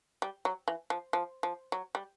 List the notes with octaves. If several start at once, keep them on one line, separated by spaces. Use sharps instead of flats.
G3
F#3
E3
F3
F3
F3
F#3
G3